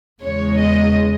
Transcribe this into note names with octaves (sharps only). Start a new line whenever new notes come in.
E2 C#3 G#3 C#5
D#5